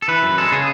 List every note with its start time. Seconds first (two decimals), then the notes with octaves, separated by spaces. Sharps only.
0.02 A4
0.08 E3 B4
0.23 F#2
0.38 G#3 A4
0.52 C#3 G#4